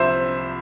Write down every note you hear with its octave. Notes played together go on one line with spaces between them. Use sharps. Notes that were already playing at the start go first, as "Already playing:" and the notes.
Already playing: C2 C3 F3 C5 E5